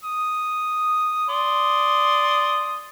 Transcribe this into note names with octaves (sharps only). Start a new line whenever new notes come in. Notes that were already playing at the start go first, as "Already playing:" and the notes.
D#6
D5 C6 D#6